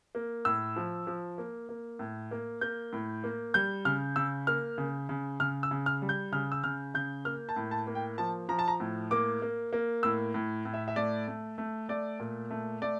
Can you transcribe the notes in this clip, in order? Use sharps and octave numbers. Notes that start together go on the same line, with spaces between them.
A#3
A2 E6
F3
F3
A#3
A#3
A2
A#3
A#3 G6
A2
A#3
G3 G6
C#3 F6
C#3 E6
A#3 F6
C#3
C#3
C#3 F6
E6
C#3
F6
G3
G6
C#3 F6
E6
C#3 F6
C#3 G6
A#3 F6
A5
A2
A5
A#3
G5
F3 A5
F3 A#5
A5
A#5
A2
A#3 D6
A#3
A#3
A2 E6
A2
A2
E5
E5
A3 D5
A3
A3
A3 D5
A#2
A3
A3 D5